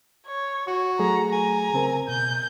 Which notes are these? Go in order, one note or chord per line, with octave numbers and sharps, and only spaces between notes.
C#5
F#4 C#6
F#3 A3 G#4 A#5
G#5 A#5
C#3 C4 A#4
B2 G6